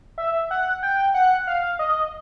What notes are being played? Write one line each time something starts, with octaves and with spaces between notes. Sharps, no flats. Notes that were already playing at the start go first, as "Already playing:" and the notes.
E5
F#5
G5
F#5
F5
D#5